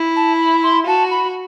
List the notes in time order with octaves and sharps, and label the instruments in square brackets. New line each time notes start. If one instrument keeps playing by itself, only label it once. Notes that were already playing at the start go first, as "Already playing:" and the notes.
Already playing: [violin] E4
[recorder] A5
B5
C6
[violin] F#4 [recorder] A5
[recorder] B5